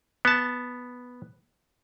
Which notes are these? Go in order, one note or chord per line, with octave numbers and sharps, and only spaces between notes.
B3 A5